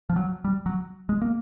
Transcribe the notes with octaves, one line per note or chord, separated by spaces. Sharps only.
F3
F#3
G3
F#3
G#3
A#3